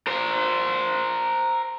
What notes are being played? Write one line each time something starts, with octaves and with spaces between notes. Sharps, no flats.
A#4 C5